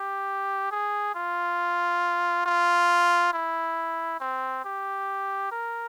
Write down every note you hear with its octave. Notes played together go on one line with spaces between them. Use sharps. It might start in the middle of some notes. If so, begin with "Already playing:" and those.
Already playing: G4
G#4
F4
F4
E4
C4
G4
A#4